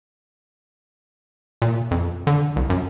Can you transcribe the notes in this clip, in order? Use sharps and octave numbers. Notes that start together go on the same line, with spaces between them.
A#2
F2
D3
C2
F#2